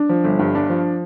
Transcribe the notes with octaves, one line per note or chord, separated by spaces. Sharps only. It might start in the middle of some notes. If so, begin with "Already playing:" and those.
Already playing: D4
F3
G1
G2
D4
F3